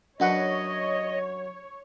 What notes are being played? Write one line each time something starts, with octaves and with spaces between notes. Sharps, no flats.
F#2 F#3 D4 B4 C#5 D#5 F#5